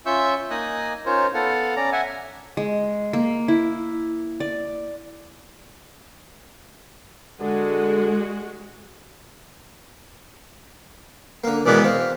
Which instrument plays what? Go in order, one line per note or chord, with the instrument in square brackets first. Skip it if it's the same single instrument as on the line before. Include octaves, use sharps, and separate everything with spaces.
[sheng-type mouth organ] C#4 F4 E5 C#6 E6 G6
A#3 D#4 D#5 G#5 D#6 F#6
C#4 D#4 F4 A#4 C5 C#5
B3 A4 F5 F#5
C#4 D5 A#5
E5 F#5 G#5
[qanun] G#3
A#3
E4
D5
[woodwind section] D3 [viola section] G#3 F#4
[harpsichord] D3 A#3
[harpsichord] B1 D#3 G#3 [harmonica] E3 B3 D5
[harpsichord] C4 [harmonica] F5